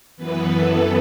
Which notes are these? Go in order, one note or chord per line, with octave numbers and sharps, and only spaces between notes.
F#2 E3 B3 B4
A4